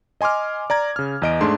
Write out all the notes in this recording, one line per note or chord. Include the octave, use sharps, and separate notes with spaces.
D#5 G#5 C6 D6 F6
D5 A#5 G#6
C#3 F6
E2 D#5 D7
G#2 A3 D4 G#4 C6